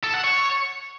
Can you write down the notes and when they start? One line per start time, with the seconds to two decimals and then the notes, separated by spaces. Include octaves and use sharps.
0.04 A4
0.14 F#5
0.24 C#5